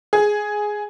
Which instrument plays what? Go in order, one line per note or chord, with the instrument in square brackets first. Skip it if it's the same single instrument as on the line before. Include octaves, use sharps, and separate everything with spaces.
[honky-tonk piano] G#4